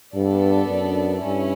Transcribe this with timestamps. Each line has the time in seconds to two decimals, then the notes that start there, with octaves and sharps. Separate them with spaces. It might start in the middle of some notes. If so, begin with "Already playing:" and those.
0.15 G2 B3 D4 A4 D5
0.69 F#2
1.23 G2 C#4 E4